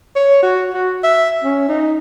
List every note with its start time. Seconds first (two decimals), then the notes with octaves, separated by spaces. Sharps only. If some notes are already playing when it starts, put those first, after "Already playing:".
0.16 C#5
0.43 F#4
0.74 F#4
1.04 E5
1.44 C#4
1.69 D#4